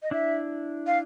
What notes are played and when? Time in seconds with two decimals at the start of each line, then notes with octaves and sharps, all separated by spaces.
0.03 D#5
0.11 D4 E4 E5
0.87 F5